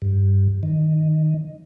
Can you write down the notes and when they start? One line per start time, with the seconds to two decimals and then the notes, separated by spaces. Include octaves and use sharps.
0.02 G2
0.63 D#3